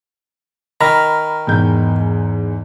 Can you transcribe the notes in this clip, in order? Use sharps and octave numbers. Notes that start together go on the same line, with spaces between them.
D#3 A#5 B5 F6
E2 G#2 G6